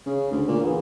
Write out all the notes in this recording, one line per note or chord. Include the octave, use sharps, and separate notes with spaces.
C#3
D2
A#2
E2